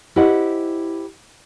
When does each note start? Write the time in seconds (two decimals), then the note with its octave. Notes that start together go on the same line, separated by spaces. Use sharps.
0.16 E4 G4 C5 D#5 F#5